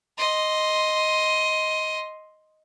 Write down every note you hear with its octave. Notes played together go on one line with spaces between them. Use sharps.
D#5 C6